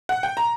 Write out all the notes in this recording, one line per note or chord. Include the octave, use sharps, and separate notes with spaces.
F#5
G5
A#5